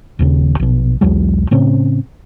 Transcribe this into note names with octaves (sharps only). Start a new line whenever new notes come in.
D#1 D#2 C#3
A#1 B2
B1 E2 F#3 G#3
A2 C#3 C4 C#4